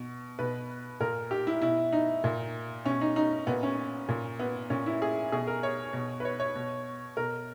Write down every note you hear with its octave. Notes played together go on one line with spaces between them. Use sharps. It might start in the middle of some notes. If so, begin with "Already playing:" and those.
Already playing: B2
B2 B4
A#2 A#4
G4
E4
B2 E4
D#4
A#2
B2 C#4
D#4
D#4
A#2 B3
C#4
A#2
B3
A#2 C#4
E4
G#4
B2 G#4
A#4
C#5
B2
B4
C#5
C#5
B2
B2 A#4